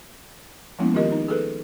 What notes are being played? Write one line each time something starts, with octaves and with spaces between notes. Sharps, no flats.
F3 G#3 A#3 B3 C#4 E4
D#3 F4 G4 A#4 D#5
D#4
G#4 A4 B4